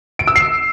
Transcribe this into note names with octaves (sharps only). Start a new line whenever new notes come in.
D7
E6
C7